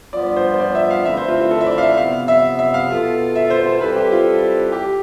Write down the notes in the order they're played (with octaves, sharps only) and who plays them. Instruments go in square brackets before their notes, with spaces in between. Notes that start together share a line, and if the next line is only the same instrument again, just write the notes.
[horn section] G2 F3 B3 F4 [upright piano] D5
[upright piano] C5
C5
D5
E5
F5
[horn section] D3 A3 C4 E4 B4 [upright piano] E5
[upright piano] C5
F4
F4
A4
E5
D5
F5
E5
[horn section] C3 F3 B3 [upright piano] F5
[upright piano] E5
E5
F5
[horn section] B2 B3 F4 A4
[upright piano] E5
C5
C5
[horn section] G3 C4 E4 A4 [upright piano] B4
[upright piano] G4
F4
G4